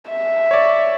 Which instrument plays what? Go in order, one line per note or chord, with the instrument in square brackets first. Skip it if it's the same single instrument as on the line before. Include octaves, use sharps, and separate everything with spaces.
[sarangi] E5
[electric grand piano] C#5 D5